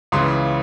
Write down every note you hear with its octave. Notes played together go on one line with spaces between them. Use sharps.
C#2 C#3 E3 C6